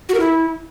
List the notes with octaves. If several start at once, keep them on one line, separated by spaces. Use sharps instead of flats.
F#4
A#4
E4